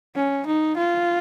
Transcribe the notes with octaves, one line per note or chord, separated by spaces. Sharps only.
C#4
D#4
F4